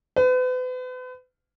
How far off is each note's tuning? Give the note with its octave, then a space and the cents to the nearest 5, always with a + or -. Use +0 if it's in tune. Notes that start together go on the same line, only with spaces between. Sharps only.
B4 +40